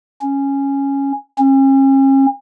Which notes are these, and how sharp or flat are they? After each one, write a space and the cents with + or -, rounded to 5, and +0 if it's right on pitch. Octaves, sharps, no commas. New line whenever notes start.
C#4 -5
C#4 -40